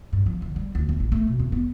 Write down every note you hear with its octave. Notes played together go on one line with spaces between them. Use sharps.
G2
F3
D3
G3
D2
D#2
A1
A3
B2
F2
B3